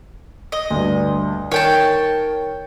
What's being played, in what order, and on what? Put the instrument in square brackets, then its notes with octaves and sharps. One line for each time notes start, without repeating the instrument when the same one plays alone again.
[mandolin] D#5
[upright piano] D2 G2
[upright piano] D#3 [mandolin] C#5 G5 A5